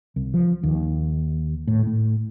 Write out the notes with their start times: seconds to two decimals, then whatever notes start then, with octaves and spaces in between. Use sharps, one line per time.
0.16 C2
0.34 F3
0.63 D#2
1.67 A2
1.87 A2